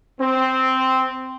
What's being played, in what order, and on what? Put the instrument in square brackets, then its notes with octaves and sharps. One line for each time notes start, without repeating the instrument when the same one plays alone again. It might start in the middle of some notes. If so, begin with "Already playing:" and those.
[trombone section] C4